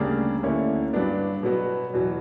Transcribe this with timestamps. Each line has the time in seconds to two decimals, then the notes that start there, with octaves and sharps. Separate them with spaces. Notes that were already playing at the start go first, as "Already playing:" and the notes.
Already playing: D2 C#3 G3 A#3 D4
0.43 D2 D3 A#3 C#4 E4
0.93 G2 F#3 B3 D4
1.43 B2 F#3 B3
1.94 E2 B2 F#3